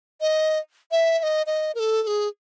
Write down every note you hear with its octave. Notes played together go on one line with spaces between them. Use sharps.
D#5
E5
E5
D#5
D#5
A#4
A4
A4
G#4